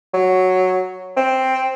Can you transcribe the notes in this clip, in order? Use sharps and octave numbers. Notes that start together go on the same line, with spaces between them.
F#3
C4